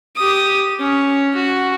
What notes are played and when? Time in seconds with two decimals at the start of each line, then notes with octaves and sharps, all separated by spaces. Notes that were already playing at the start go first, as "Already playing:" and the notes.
0.15 G4 D#6
0.79 C#4
1.35 F#4